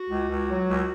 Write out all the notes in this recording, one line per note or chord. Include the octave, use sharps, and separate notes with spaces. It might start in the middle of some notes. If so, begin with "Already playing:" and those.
Already playing: F#4
C#2
C#2
F#3
C#2